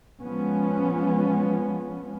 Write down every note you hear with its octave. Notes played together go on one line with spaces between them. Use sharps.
F3 G#3 B3 C#4